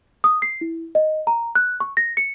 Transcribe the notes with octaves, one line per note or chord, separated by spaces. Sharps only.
D#6
C7
E4
D#5
A#5
F#6
C#6
A#6
C#7